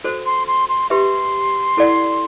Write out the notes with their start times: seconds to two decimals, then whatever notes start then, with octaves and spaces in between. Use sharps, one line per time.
0.04 F#4 A4 C5
0.26 C6
0.48 C6
0.69 C6
0.90 G4 B4 E5 C6
1.77 E4 A4 D5 F#5